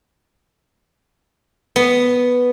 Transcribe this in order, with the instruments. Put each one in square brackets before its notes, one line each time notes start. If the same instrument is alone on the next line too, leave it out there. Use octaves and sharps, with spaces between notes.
[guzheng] B3